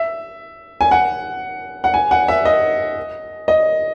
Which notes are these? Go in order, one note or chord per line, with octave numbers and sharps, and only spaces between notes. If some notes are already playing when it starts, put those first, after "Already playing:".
Already playing: E5
G#5
F#5
F#5
G#5
F#5
E5
D#5
D#5